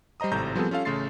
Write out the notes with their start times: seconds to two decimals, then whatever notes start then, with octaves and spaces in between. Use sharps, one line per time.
0.20 G3 C5 D#5 A#5 D#6
0.32 G#1 A2 C3 A4 A#5 G6
0.55 F3 G3 B3 C4 G#4 A4
0.70 G3 C#4 F4 A4 F5
0.85 A1 C#3 A3 C6 A6 C7